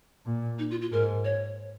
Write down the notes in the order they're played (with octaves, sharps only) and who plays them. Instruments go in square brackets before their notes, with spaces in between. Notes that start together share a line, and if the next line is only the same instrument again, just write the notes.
[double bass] A#2
[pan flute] D#4
F4
F4
[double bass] G#2 [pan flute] A#4
[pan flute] C#5